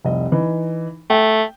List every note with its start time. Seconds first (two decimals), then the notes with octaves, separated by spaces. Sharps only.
0.04 F1 C2 D#5
0.32 E3 D#4
1.10 A3 G5